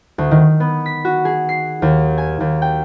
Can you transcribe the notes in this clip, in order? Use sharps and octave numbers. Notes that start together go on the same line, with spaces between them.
D2
D#3
B3
B6
F#4
G#4
C7
D#2
G#5
D#2
G5